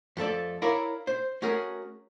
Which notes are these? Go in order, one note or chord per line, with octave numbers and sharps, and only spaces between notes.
F2 A3 A4 D5
E4 A#4 C#5 D5 E5 F5
C5
A3 C#4 F#4 G#4 A#4